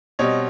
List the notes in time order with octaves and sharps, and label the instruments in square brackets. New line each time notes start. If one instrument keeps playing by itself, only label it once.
[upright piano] B2 G3 C4 C#5 D#5